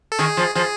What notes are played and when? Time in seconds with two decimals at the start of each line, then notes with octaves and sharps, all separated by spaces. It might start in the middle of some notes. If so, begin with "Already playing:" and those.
0.12 A4
0.19 D#3 G#4
0.37 F3
0.55 F3 G#4